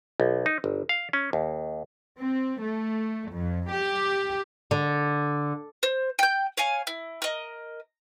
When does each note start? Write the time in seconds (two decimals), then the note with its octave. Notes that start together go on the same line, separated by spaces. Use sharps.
0.20 B1
0.46 D#4
0.64 G1
0.89 F5
1.13 C#4
1.33 D#2
2.20 C4
2.60 A3
3.31 F2
3.71 G4
4.71 D3
5.83 C5
6.19 G5 G6
6.57 C#5 F5 G#5
6.87 E4
7.22 A#4 D#5